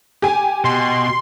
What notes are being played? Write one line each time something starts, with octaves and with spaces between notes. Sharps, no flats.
G4 G#5
B2 C6